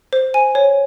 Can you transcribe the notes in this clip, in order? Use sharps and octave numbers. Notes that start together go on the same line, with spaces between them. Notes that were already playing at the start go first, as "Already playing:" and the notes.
C5
G#5
C#5